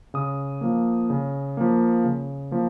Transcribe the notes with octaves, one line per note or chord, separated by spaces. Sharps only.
C#3 D#6
F3 A#3
C#3
F3 A#3
C#3
F3 A#3